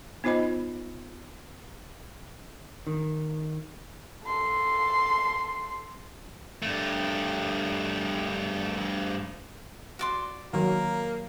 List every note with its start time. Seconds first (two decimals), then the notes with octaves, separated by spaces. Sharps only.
0.24 B3 D#4 F4 C5 D#5 B5
2.87 D#3
4.24 A4 C6
6.62 G2 A3
9.99 F#4 D5 C6
10.53 D#3 F#3 A#3 A#4